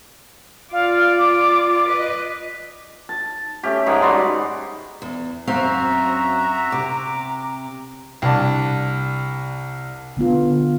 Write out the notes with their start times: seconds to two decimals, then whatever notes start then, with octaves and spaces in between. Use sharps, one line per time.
0.73 F4 D5 F5
1.18 D6
1.86 B4 D#5
3.09 A5
3.63 A3 C#4 G4
3.86 G#2 D#3 G#4
4.02 G3 F#4 D5 C6
5.02 E2
5.47 F#2 C4 F#4 E5 F5 A#5
6.72 C3 D6
8.22 C2 D4 A5
10.17 D3 B3 F4